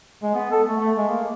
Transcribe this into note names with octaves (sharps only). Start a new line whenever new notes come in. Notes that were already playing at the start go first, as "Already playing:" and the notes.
G#3
B3
A4
A3
A3
G#3
A#3